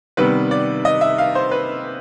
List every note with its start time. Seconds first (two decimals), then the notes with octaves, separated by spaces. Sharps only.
0.17 C3 D#3 G3 B3 B4
0.51 D5
0.85 D#5
1.01 E5
1.18 F5
1.35 C5
1.51 B4